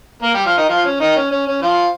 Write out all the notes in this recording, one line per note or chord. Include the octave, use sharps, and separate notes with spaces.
A#3 A#4
G3 G4
F3 F4
D#3 D#4
F3 F4
C#4
D#3 D#4
C#4
C#4
C#4
F3 F4